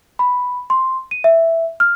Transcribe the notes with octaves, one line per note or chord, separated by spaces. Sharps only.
B5
C6
D#7
E5
F6